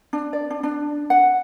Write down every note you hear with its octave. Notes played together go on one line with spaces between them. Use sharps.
D4
D5
D4
D4
F#5